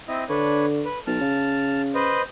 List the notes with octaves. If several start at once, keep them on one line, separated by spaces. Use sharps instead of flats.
C4 E4 D#5
D3 D4 B4 C#5
B4
B1 A5 F6
C#3
B4 C5 D#5